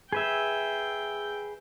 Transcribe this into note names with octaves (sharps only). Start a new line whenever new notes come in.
G#4 B4 E5 G5